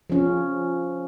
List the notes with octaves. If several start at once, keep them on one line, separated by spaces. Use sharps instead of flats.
F3 C#4